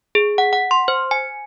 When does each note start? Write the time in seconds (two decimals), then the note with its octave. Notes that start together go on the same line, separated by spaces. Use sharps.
0.15 G#4
0.38 F#5
0.53 F#5
0.71 C6
0.88 C5
1.11 G#5